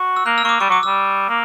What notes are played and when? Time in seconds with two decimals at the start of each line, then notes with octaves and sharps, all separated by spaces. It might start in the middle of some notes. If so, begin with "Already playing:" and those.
Already playing: F#4
0.17 E6
0.26 A#3 F#6
0.38 E6
0.44 A#3 C#6
0.49 D6
0.60 G3 C#6
0.69 F#3 D6
0.83 G3 E6
1.29 A#3